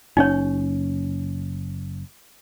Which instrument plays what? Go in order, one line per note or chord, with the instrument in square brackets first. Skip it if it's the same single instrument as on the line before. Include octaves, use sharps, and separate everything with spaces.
[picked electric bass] F#1 C#4 [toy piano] D#4 C#5